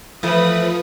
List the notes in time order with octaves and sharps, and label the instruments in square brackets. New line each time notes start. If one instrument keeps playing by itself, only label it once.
[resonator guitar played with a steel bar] E3 A3 [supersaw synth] F3 [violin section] B4 D#6